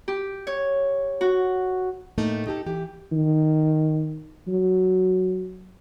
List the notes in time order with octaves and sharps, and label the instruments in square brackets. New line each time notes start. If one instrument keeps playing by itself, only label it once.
[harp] G4
C#5
F#4
[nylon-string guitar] A2 A3 A#3 D#4
D#4 G4 A4
E3 G4
[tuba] D#3
F#3